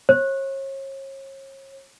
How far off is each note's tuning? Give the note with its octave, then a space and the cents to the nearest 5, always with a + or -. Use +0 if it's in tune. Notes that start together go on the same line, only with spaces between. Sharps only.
C#5 -40